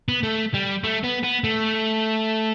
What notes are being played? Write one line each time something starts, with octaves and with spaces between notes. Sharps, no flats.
B3
A3
G3
A3
B3
B3
A3